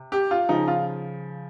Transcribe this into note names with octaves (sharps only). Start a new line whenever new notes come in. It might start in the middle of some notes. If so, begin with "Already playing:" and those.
Already playing: C3
G4
F4
C#3 F3 D#4
F4